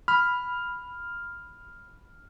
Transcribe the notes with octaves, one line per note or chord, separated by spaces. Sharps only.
B5 F6